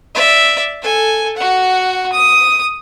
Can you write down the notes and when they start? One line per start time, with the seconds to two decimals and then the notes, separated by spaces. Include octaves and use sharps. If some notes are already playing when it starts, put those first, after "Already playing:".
0.14 D5 E5
0.82 A4 G#5
1.37 F#4 F#5
2.12 D#6